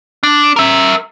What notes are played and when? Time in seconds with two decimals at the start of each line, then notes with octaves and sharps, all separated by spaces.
0.23 D4
0.56 A#4 E5